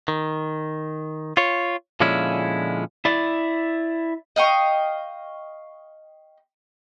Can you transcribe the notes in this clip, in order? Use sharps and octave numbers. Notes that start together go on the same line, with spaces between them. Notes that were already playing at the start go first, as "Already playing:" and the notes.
D#3
F4 C#5
A#2 D3 F3 G#3 C#4 E4
E4 D5
D#5 F5 G5 C#6